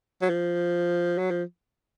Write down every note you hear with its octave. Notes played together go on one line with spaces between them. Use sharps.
F#3
F3
F#3
F3